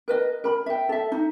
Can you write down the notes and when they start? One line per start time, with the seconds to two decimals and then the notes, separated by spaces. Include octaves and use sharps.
0.08 A#4 B4 D#5
0.44 A#4 B5
0.66 E5 G5
0.89 A4 E5
1.12 D#4